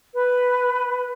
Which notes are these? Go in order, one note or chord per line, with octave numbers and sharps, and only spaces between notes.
B4